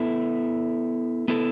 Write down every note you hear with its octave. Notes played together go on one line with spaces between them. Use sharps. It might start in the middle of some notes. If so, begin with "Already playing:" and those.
Already playing: B3 E4 A4 E5
B3 E4 A4